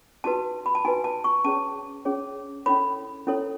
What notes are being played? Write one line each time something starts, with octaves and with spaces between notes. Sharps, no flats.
D#4 F#4 B4 A5
B5
A5
D#4 F#4 B4 G#5
A5
C#6
C#4 G#4 C#5 A5
C#4 G#4 C#5
C#4 E4 A4 C#5 B5
C#4 E4 A4 C#5